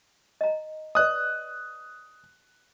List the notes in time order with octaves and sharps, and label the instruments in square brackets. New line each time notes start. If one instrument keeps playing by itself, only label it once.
[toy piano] D#5 A#5
[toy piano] B4 D5 D#5 [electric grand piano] D#6 F#6